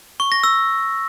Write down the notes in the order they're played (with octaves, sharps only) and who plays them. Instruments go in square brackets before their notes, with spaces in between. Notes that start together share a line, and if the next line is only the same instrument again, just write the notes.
[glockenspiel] C#6
A#6
E6